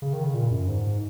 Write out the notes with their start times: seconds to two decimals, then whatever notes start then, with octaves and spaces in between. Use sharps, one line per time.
0.02 C#3
0.13 D#3
0.24 C#3
0.34 A#2
0.50 F#2
0.67 G#2